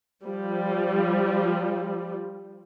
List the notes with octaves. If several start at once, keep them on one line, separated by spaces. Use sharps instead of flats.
F3 G3